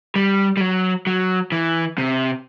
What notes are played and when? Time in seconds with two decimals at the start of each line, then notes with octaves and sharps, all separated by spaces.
0.16 G3
0.57 G3
0.61 F#3
1.07 F#3
1.52 E3
1.98 C3